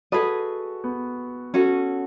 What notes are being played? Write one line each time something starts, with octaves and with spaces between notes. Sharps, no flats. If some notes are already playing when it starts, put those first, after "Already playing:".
F#4 G#4 A4 B4 D#5
B3
C#4 F#4 A4